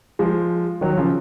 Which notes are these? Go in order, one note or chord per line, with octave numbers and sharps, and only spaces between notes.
F3 G#3
D#3 F#3
C#3 F3